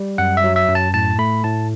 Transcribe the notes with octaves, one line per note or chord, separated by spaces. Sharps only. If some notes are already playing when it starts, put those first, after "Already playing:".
Already playing: G3
F#2 F#5
E5
F#3
E5
F#2
A5
A2 A5
A3 B5
A2 A5